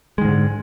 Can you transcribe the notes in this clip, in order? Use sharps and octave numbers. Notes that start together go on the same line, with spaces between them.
G#2 D3 D#3 G#3